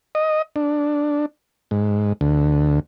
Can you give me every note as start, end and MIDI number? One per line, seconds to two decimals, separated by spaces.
0.15 0.42 75
0.56 1.26 62
1.71 2.13 44
2.21 2.79 38